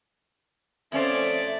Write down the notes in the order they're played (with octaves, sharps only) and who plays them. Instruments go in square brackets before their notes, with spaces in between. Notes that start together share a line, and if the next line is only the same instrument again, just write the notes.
[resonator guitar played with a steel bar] F2 C#4 C5 [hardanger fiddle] A3 D5 [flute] E5